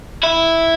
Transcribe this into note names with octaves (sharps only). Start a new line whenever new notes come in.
E4